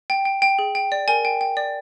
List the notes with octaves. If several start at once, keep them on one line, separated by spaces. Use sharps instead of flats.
G5
G5
G5
G#4
G5
D5
A#4 G#5
G5
G5
D5